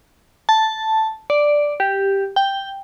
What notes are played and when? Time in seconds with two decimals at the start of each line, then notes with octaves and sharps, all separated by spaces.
0.49 A5
1.30 D5
1.80 G4
2.36 G5